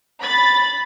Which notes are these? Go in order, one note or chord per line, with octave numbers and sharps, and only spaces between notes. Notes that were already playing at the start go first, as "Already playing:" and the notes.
B5 A6